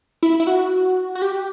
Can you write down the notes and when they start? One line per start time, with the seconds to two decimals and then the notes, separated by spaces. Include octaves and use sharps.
0.23 E4
0.40 E4
0.47 F#4
1.15 F#4
1.22 G4